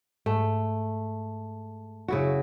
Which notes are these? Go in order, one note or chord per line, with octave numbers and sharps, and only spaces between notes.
G#2 A3
F#2 C#3 E4 F#4